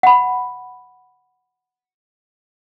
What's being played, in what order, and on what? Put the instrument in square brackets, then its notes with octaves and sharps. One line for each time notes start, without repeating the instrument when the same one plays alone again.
[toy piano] F#5 B5